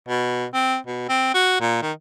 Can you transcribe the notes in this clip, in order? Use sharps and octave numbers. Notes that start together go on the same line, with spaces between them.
B2
C4
B2
C4
F#4
A#2
D#3